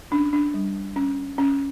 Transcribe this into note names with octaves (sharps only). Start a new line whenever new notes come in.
C#4 D4
D4
G3
C#4
C#4